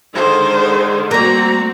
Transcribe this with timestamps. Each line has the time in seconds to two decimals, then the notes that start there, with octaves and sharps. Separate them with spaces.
0.15 D3 D#3 G#3 C5
1.11 G3 A3 A#3 C4 F#4 A#5